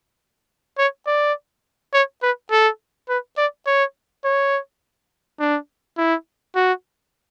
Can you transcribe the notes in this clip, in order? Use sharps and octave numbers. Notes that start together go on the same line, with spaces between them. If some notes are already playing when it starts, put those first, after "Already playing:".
C#5
D5
C#5
B4
A4
B4
D5
C#5
C#5
D4
E4
F#4